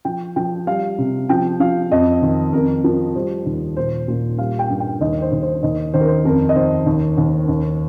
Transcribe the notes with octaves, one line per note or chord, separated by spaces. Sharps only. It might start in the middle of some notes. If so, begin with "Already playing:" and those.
F3 G5
F3 G5
G3 F5
C3
F3 G5
F3 F5
F2 D#5
D#3
F2 A#4
F3 A#4
G3 C5
D#2
A#2 C5
A#2
G3 F5
G5
G2
G5
D#2 D#5
C5
D#2
C5
D#2 D#5
D#3 C5
A#4
C5
F2 A#4
D#5
D#3 C5
D#2
D#2
D#2